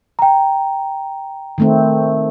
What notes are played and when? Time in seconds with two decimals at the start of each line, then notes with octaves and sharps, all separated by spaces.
0.19 G5 A#5
1.58 D#3 A3 C4